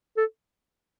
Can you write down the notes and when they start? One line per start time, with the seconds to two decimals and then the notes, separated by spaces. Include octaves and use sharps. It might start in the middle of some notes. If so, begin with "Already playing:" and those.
0.17 A4